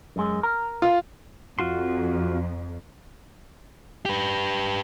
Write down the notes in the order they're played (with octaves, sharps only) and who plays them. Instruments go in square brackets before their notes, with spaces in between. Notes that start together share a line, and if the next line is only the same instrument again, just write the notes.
[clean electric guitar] F#2 G#3
A#4
[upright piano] F4
[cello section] F2 [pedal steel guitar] F4 F#4 C6
[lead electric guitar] G4 B4